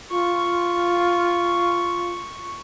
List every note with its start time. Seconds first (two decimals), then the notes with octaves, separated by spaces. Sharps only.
0.10 F4 C#6